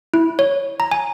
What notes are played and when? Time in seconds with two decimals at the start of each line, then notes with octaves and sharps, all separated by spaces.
0.14 E4
0.39 C#5
0.80 A#5
0.91 G#5